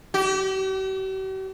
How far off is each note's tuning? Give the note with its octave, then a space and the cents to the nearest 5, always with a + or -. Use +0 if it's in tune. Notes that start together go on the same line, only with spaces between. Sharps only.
G4 -45